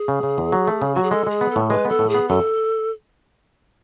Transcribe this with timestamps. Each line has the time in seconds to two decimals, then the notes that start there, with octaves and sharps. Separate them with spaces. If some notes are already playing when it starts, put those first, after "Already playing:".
Already playing: G#4
0.08 C#3
0.23 C#3
0.38 E2
0.52 F#3
0.68 A3
0.82 C#3
0.95 F#3 F#4
1.03 G#4
1.11 G#3 A4
1.27 G#3 G#4
1.41 B3
1.51 A4
1.56 A2
1.70 G#3 B4
1.85 B3 A4
1.99 A2
2.09 G#4
2.14 B3
2.29 F#2 A4